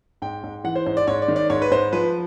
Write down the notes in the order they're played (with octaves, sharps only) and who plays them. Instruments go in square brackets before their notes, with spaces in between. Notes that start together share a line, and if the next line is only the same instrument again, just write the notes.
[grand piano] G#2 G5
G#2
E3 F#5
C5
G#2 C5
D5
G#2 C#5
D5
D#3
D5
G#2 C#5
B4
G#2 C5
F3 B4